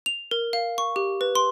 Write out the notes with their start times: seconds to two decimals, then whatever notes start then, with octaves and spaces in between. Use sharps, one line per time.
0.06 F7
0.31 A#4
0.53 F5
0.78 C#6
0.96 G4
1.21 B4
1.35 C6